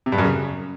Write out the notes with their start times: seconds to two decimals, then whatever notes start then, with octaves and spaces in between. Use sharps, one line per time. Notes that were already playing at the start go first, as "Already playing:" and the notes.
0.06 C3
0.12 G2
0.18 F#2
0.24 C#3